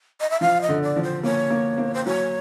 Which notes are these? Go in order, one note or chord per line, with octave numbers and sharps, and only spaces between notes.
D#5
E5
F3 F5
D#5
D3
D5
F3
C5
A#3 C#5
A#3
A#3
C5
F#3 C#5